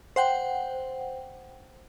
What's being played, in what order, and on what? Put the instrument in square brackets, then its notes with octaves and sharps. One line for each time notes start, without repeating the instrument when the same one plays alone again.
[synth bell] C5 F#5 G5